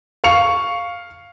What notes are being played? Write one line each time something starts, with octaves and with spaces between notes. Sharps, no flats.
F5 C#6 C#7 F7